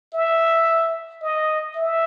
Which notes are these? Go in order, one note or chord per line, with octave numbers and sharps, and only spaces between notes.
E5
D#5
E5